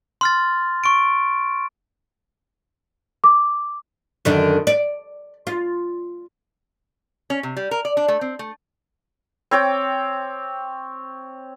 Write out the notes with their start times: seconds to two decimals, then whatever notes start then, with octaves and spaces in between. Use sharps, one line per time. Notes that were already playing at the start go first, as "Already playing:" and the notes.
0.21 C6 F6 A6
0.84 C#6 D7
3.24 D6
4.25 F#2 D3 D#3
4.67 D5
5.47 F4
7.30 C#4
7.43 C3
7.56 G3
7.71 A#4
7.85 D5
7.97 D4
8.08 A3
8.21 C4
8.39 A3
9.51 C4 C#5 G5 D6